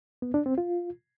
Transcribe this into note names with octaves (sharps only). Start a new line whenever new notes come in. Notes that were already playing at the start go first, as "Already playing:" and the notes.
B3
D4
C4
F4